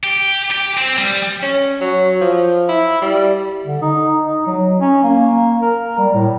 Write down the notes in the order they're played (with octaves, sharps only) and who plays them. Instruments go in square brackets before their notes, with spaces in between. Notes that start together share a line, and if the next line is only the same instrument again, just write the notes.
[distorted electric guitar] G4
G4
C4
G3
[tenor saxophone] C#4
F#3
F3
E4
G3
[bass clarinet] D3
D#4
D#4
F#3
C#4
A#3
A#4
G3
A2